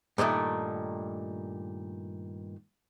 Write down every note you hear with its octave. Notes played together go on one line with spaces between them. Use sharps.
G2 A#2 D#3 G#3 A3